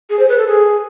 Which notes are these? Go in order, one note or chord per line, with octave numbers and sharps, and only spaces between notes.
G#4
C5
B4
A4
G#4